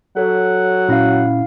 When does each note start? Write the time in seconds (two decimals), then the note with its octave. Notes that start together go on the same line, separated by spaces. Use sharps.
0.17 F#3 A4 C#5 F#5
0.89 A#2 C#4 E4 F5